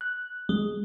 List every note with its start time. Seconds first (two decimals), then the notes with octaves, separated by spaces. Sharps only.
0.01 F#6
0.49 G#3